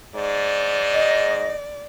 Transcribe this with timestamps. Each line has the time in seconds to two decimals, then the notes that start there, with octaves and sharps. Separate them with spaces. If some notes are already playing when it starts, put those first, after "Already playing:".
0.15 G#2 D5
0.94 D#5